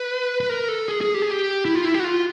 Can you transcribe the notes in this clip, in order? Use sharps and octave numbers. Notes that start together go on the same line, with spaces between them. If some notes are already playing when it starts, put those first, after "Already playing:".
Already playing: B4
B4
A#4
A4
G#4
G#4
G4
G#4
G4
E4
F4
E4
G4
F#4
F4